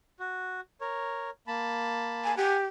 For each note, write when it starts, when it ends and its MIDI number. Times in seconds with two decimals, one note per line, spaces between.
0.20 0.61 66
0.81 1.30 70
0.81 1.30 73
1.47 2.35 58
1.47 2.35 81
1.47 2.35 83
2.24 2.36 80
2.37 2.66 67
2.37 2.57 78
2.37 2.57 80